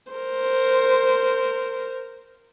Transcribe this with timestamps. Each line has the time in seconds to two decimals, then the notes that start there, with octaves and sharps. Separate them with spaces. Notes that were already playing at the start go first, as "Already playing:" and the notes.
0.12 A#4 C5